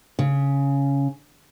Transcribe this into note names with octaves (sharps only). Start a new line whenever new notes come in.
C#3